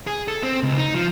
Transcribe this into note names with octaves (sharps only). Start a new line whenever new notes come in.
G#4
A4
C4
C#2
D#4
F3